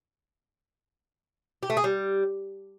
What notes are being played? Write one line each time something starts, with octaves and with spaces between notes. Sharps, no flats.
G4
A3
G#4
G3